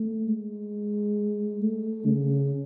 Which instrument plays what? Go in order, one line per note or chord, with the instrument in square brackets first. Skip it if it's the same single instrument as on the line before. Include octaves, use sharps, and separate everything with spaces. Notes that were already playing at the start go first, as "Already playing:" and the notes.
Already playing: [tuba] A3
G#3
A3
C#3